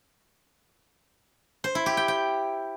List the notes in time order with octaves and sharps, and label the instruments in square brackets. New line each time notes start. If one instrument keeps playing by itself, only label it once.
[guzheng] C5
E4
G4
G5
G5